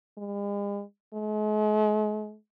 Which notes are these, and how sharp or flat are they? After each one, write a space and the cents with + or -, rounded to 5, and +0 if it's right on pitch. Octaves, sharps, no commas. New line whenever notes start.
G#3 -45
G#3 +40